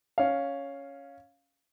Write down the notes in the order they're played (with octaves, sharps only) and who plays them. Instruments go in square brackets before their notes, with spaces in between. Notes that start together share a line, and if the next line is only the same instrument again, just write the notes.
[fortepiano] C#4 F5